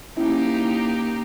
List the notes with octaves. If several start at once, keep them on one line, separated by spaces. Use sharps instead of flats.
A#3 C#4 D#4 E4 G4